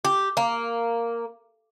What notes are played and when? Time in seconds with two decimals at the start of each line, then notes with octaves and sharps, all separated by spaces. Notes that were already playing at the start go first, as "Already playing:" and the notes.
0.05 G4
0.37 A#3